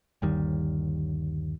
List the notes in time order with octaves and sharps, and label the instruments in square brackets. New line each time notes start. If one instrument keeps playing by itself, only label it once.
[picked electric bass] G1 D#2 D#3 G3